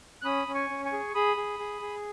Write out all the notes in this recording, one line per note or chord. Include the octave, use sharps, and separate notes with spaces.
F#6
C#4 B5 D#6
C#4
G#5 C#6
C#4
G#5 C#6
G#4
G#4 B5 D#6
G#4
G#4
G#4